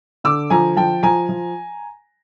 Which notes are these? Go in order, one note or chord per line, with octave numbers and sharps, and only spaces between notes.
D3 D6 E6
F3 G#5 A#5
F3 G5 A5
F3 G#5 A#5
F3